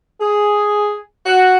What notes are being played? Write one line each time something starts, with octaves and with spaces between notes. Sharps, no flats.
G#4
F#4